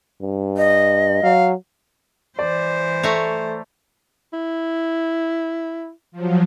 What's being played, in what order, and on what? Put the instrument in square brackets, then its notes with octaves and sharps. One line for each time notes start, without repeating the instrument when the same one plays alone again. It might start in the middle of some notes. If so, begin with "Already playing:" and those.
[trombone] G2
[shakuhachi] D#5
[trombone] F#3 [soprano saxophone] F5
[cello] E3 C5 [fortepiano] D5
[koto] A3 C#5 A#5
[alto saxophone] E4
[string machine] F3 F#3